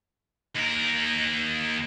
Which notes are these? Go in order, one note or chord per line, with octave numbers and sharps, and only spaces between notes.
D#2 A#4